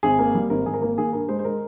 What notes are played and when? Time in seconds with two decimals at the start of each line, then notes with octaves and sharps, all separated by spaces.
0.03 G#1 G#4
0.19 A#3
0.34 G3
0.50 G#1 A#4
0.66 G#1 G#4
0.74 A#4
0.82 A#3
0.98 D#3 G#4
1.13 G2 A#4
1.28 G#3 C5
1.39 C5
1.45 G#3 A#4